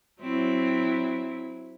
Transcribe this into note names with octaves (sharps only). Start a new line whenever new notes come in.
F#3 C4 E4